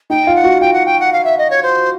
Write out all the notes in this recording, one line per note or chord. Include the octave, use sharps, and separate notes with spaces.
D#4 G5
F4
F#5
F#4
F4 G5
F#5
G5
F#5
F5
E5
D#5
C#5
C5